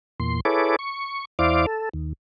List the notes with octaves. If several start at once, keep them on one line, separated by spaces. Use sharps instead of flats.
E2 A#2 C6
E4 G#4 A4 B4 C#5 D6
C#6
E2 E4 C5 D5 F5 D6
A4
D#2